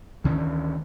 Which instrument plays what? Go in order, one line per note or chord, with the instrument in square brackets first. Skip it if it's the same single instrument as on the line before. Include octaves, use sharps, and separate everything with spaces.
[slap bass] D2 D#3 E3 C#4